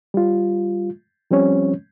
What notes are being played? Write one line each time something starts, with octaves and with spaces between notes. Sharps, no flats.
G3 F4
F3 G3 C4 C#4 C#5